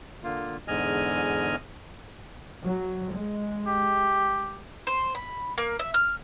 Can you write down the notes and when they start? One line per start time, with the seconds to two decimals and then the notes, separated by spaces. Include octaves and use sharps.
0.24 D3 A#3 F4
0.68 E2 G#2 D3 D#5 G#5 F6
2.63 F#3
3.14 G#3
3.67 G4
4.87 C5
5.15 B5
5.58 A#3
5.79 E5
5.94 F6